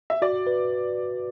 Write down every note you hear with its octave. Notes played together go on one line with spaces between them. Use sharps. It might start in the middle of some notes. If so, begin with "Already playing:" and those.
E5
F#4 D5
B4